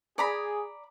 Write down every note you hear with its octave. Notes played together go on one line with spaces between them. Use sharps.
G#4 D5 A#5 B5